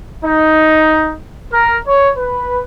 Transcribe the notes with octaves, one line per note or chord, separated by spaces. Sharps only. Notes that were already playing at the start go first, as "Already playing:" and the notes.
D#4
A#4
C#5
B4